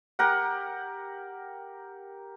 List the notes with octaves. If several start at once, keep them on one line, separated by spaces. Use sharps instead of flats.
G4 A#4 F#5